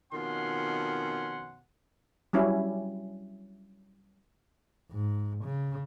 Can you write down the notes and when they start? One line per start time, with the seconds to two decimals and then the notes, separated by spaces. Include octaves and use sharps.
0.13 F2 B2 D#3 C#4 F#5 C6
2.33 F#3 G3 C#4 E4
4.92 G#2
5.44 C#3